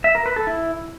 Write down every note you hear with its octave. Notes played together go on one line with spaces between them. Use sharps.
E5
A#4
B4
A4
E4